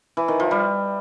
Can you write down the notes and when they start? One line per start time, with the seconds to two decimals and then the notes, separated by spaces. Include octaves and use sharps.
0.17 E3
0.28 D#3
0.40 F3
0.51 G3